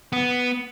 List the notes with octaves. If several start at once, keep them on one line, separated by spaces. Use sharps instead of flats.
B3